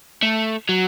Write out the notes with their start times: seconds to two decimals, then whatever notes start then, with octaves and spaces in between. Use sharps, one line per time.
0.22 A3
0.69 F#3